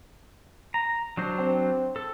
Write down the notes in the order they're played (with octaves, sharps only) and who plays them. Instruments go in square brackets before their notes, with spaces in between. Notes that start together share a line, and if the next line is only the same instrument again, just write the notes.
[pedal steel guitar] A#5
F#3 D4 C5
[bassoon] C4
[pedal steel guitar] A4